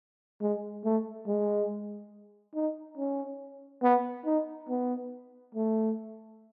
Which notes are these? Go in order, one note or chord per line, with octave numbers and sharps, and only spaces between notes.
G#3
A3
G#3
D#4
C#4
B3
D#4
B3
A3